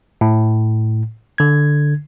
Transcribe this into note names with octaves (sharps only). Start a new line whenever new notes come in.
A2
D3 G#6